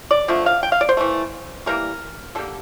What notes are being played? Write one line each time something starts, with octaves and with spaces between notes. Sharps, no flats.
D5
D3 F3 A3
F5
G5
F5
D5
C5
E3 A3
E3 G3 A#3 A#4
D3 G3 A#3 A4